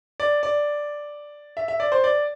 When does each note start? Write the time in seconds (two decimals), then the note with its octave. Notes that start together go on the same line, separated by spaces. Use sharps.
0.20 D5
0.43 D5
1.57 E5
1.68 E5
1.80 D5
1.92 C5
2.04 D5